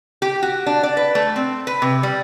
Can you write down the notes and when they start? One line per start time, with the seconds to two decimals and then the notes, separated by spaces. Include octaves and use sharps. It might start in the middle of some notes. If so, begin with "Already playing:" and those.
0.22 G4
0.43 F#4
0.66 D4
0.83 D5
0.97 B4
1.15 A3
1.36 C4
1.67 B4
1.82 C3
2.03 G3